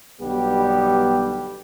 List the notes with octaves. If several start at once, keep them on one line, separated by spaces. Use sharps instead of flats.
B1 D3 G3 B3 G4